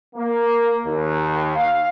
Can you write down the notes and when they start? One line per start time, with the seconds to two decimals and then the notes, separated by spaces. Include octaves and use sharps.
0.16 A#3
0.86 D#2
1.56 F5